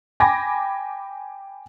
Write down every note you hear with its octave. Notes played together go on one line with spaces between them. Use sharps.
G5 G#5 B5 D6 G#6 A#6